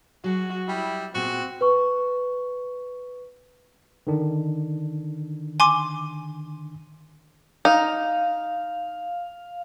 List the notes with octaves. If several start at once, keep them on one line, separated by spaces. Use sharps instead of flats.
F#3 F#4 G#4
G3 E4
A#2 B3 C4 F#4 G#4
B4 C#6
D3 D#3 D4
G#5 C6 D6
D#4 F5